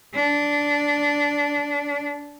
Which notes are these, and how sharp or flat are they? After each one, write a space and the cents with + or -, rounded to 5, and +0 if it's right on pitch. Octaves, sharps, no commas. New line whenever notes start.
D4 -15